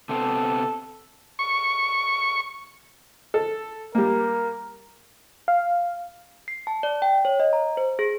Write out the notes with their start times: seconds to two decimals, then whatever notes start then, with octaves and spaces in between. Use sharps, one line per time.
0.09 C3 B3 C4 A4
1.39 C#6
3.34 A4
3.95 G3 A#3 A#4
5.48 F5
6.48 C7
6.67 A5
6.83 D5
7.02 G5
7.25 C#5
7.40 D#5
7.53 A#5
7.77 C5
7.99 G#4